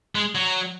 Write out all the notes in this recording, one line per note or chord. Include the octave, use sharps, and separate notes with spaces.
G#3
F#3